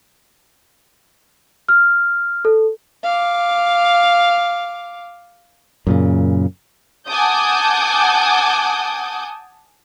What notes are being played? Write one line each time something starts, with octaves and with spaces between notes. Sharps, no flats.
F6
A4
F5 D6
F#2 A#2 C#3
F#5 G#5 A5 D6 D#6 G6